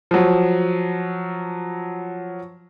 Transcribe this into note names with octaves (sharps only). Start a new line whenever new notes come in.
F3 F#3